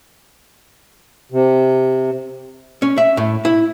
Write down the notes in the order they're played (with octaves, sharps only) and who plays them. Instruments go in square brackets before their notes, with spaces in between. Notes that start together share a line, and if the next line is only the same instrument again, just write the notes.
[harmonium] C3
[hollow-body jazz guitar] C#4
E5
A2
E4